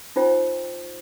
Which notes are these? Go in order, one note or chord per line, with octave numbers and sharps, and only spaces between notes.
D#4 F4 C5 G5